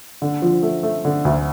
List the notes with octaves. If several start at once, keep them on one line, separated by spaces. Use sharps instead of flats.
D3
F3
A3
A3
D3
D2